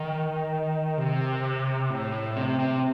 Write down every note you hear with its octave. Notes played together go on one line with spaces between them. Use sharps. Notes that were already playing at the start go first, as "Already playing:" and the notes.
Already playing: D#3
C3
A2
A2
C3
C3